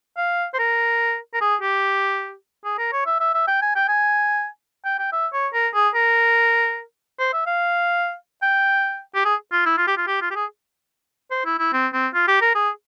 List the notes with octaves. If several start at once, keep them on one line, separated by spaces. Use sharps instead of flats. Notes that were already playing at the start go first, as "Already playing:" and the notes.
F5
C5
A#4
A#4
G#4
G4
G#4
A#4
C#5
E5
E5
E5
G5
G#5
G5
G#5
G5
G5
E5
C#5
A#4
G#4
A#4
C5
E5
F5
G5
G4
G#4
F4
E4
F4
G4
F4
G4
F4
G4
G#4
C5
E4
E4
C4
C4
F4
G4
A#4
G#4